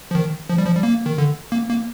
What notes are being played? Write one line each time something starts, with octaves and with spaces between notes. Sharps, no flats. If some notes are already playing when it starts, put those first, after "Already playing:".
F3
D#3
F3
G3
F3
G3
A#3
D#3
D3
A#3
A#3